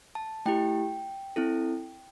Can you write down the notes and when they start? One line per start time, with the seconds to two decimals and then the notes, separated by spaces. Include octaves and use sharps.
0.15 A5
0.46 A3 E4 G4 G5
1.36 C4 E4 A4